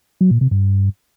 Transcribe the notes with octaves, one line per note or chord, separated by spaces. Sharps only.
F#3
A#2
C3
G2